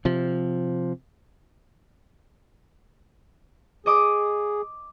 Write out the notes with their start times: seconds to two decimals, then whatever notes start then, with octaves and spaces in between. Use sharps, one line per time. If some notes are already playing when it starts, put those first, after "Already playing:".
0.05 C3 F3
3.86 G#4 D#5 D6 D#6